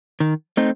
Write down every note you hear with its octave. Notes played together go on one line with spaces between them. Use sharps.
D#3
A3 C4 D#4